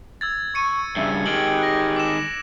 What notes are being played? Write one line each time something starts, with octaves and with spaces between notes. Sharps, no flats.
E6 G#6 A6
C#6 C#7 D#7
G2 C#3 E5
D#3 G#3 G4 D7 F#7
F#6 A#6
D6 E6 E7